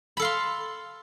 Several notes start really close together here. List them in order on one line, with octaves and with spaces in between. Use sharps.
B5 A4 F5 C6